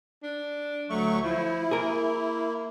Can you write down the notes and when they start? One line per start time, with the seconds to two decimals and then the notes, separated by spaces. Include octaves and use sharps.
0.23 D4
0.90 D2 F#3 A3 C#6
1.23 F3 E4
1.71 A#3 G#4 A#4